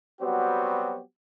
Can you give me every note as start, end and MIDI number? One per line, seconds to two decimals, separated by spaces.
0.21 1.00 54
0.21 1.00 55
0.21 1.00 59
0.21 1.00 60
0.21 1.00 66
0.21 1.00 67